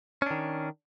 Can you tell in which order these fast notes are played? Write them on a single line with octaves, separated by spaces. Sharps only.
C#4 D4 D#3